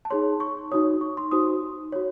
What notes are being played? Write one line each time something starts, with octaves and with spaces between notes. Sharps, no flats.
A5
D#4 G#4 C#5 C6
C#6
D#4 F#4 C#5 D#6
C#6
C6
D#4 F#4 C5 D#6
F#4 C#5